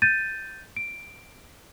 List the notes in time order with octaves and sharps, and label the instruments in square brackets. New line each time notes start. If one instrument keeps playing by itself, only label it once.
[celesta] G6 A6 D#7
D7